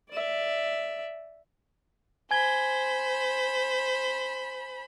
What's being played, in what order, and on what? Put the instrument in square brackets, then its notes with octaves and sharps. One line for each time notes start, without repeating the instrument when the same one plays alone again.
[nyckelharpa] D5 E5
[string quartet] C5 B5 [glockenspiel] G#5 G#6 G7